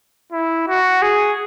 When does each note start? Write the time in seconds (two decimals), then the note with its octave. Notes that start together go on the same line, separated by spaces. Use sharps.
0.32 E4
0.68 F#4
1.02 G#4